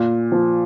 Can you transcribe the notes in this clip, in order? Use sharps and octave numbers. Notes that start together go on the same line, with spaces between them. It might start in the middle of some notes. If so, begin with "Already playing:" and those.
Already playing: A#2
F3